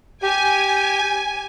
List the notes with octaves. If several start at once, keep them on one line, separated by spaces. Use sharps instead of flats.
G4 G#5